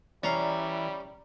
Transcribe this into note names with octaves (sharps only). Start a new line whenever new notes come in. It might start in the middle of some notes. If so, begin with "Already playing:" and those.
E3 G3 C#4 D5 A#5 C7